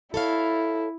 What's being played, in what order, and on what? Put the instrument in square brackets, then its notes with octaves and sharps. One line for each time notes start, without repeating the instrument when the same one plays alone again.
[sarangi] E4 [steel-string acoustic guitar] A4 C#5 F5